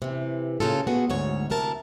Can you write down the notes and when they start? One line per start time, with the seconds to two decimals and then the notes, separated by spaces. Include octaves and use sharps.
0.02 C3 E3
0.60 A#2 C#3 F4 A4
0.87 B2 B3 F#4 G#4
1.10 D2 G#2 C#5
1.50 D2 C3 E4 A#4 A5